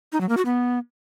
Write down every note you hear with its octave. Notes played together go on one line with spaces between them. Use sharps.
D#4
F#3
A#3
F#4
B3